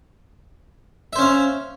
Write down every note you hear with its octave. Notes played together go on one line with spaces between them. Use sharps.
C#4 C5 E5 F5